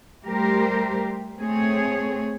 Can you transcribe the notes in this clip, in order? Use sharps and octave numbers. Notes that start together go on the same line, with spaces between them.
G3 A3 G4 A#4 C5
A3 C4 G#4 C#5